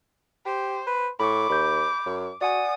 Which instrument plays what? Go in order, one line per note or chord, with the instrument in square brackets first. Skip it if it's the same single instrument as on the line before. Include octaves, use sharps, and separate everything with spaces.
[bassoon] G4 [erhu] C5
[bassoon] B4
[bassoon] A2 [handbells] B5 C#6 [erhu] D6
[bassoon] D#2 [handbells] B5 G6
[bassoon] F#2
[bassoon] F#4 [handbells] D5 F#5 G#5 [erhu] D#6